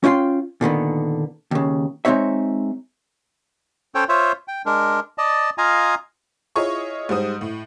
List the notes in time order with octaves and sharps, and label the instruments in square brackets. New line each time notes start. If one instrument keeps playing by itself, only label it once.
[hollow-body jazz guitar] C#4 E4 F4 G5 C6
A#2 D3 D#3 B3
D#2 C#3
G#3 C4 D4 D#4 C#5 E5
[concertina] C#4 A4 C5 C#5 G5
F4 C5 C#5 E5
G5
G#3 D4 A#4
D5 D#5 A5
F4 D#5 F5 G#5 A#5
[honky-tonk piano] E4 F4 G#4 C#5 D#5 C#6
G#2 G3 C5 D#6
A2